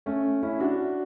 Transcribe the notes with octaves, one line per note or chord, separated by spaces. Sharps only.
A3 C#4
C#4 E4
D4 F#4